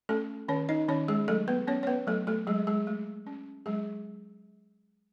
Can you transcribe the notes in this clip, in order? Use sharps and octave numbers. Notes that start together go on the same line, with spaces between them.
A3 C#4 A4
D#3 C#4 C#5
D#4 D#5
D#3 C#4 C#5
G#3 G#4
F#3 A3 A4
B3 B4
B3 C#4 C#5
C#5
B3 B4
F#3 A3 A4
A3 A4
F#3 G#3 G#4
G#3 G#4
A3
C#4
F#3 G#3 G#4